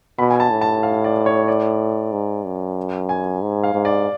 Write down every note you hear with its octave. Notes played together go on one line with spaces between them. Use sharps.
B2 B5
G#5
A5
A2
A5
F5
D5
C#5
D5
G#2
F#2
G#5
G#2
F5
G#2
D5